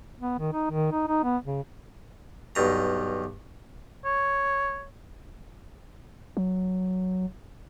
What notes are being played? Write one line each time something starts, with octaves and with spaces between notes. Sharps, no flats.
B3
D#3
D#4
D#3
D#4
D#4
B3
C#3
B1 G2 A#5
C#5
F#3